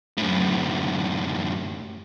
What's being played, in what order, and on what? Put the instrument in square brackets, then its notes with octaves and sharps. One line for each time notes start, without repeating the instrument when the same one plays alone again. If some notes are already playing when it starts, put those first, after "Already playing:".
[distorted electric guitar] F#2 A2